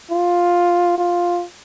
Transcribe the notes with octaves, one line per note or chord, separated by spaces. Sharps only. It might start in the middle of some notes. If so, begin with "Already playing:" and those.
F4
F4